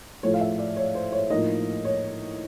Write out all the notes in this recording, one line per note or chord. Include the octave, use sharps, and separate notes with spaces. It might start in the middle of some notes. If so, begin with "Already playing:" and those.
A2 F3 A3 C#5
F5
E5
D5
C#5
C5
C#5
A2 F3 A#3 D#4 D#5
C#5